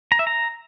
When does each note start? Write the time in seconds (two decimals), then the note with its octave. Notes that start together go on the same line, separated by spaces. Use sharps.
0.12 A#5
0.19 E5
0.27 A#5